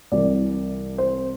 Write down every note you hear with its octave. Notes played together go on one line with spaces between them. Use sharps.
C2 C3 E3 D5
C5